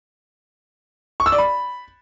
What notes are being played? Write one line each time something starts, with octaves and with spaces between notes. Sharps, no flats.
C#6
E6
D5
B5